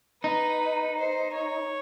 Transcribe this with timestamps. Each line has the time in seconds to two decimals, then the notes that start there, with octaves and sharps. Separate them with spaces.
0.23 D#4 B4
0.98 C5
1.35 C#5